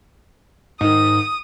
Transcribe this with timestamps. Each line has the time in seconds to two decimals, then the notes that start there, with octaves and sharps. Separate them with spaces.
0.81 G#2 D#3 D#4 D#6